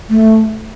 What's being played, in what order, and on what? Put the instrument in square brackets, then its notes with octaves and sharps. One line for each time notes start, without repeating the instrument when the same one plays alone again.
[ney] A3